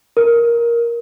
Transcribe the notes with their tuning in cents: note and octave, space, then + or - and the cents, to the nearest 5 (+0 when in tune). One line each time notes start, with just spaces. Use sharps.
A#4 +10